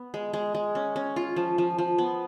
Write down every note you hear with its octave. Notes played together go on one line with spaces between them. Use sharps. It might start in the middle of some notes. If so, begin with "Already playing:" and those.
Already playing: B3
G#3
G#3
G#3
C#4
C#4
F4
F3
F3
F3
B3